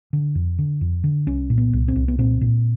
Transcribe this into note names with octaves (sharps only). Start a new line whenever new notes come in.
D3
F2
D3
F2
D3
C2 C#4
A#2
B3
C2
C4
C2
B3
A#2 C4
A#2